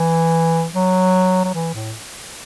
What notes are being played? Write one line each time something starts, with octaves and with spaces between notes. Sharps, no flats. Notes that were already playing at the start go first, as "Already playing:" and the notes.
Already playing: E3
F#3
F#3
E3
A2